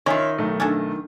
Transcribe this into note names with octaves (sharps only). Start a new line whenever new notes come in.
D#3 C#4 F4 C#5 E5 C6
B1 A3
C#4 D4 A4